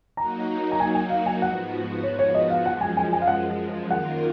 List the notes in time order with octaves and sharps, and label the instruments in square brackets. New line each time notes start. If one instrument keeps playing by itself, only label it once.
[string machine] F#3 A#3 D#4 F#4 [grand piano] A#5
[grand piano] A#5
G#5
G#5
F5
G#5
[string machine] G#2 F3 B3 F#4 [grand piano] F#5
[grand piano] C#5
C#5
D#5
F5
[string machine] F#2 F3 G#3 [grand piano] F#5
[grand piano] G#5
G#5
G#5
F5
F#5
[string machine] F#2 D#3 A#3 F4 A#4 [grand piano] F#5